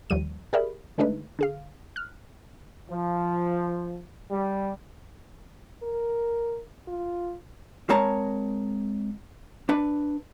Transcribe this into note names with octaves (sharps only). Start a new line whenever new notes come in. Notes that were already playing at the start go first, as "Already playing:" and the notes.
D#2 F3 G3 D#7
G4 G#4 A#4 D5 E5 B5
D3 G#3 A3 D4 D#4 B4
D3 G#4 F5
F6 F#6
F3
G3
A#4
F4
G#3 C4 A#4 C#5 A5 A#5
D4 B4